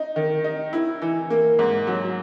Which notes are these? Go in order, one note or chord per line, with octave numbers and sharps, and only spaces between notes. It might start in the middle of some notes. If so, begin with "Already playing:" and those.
Already playing: D#4
D#3
D#4
E4
E3
A#3
G#2
F#3